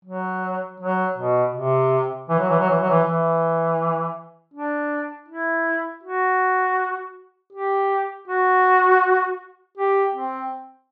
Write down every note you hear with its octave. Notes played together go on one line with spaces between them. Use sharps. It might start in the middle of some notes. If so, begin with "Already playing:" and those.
F#3
F#3
B2
C3
E3
F#3
E3
F#3
E3
F#3
E3
E3
D4
E4
F#4
G4
F#4
G4
C4